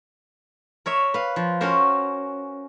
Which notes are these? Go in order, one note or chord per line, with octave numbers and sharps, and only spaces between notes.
A#4 C#5 E5
B4 F5
F3
C#4 F#4 A#4 C5